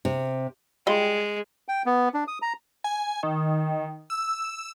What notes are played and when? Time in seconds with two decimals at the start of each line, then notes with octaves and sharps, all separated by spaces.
0.05 C3
0.87 G3 G#3 F4 D#5
1.68 G5
1.86 B3
2.14 D4
2.28 D#6
2.42 A#5
2.84 G#5
3.23 D#3
4.10 E6